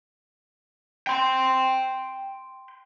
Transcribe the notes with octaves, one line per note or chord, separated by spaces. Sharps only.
G5 C6